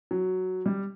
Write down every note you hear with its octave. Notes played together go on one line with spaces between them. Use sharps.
F#3
G3